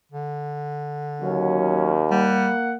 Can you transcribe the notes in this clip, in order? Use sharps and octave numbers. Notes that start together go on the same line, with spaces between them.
D3
D#2 F#3 C#4
G3 A#3 F#5